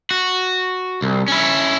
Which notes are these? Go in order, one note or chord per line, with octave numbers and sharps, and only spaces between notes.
F#4
C2
C#4 E4